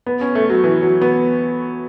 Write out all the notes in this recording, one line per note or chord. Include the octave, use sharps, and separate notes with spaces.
B3
C#4
A3
F#3
E3
F#3
B3